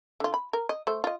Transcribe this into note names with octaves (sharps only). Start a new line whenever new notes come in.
D3 F4
B5
A#4
D#5
A3 C5
F4 D#5